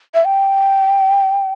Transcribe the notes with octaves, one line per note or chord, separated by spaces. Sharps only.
E5
G5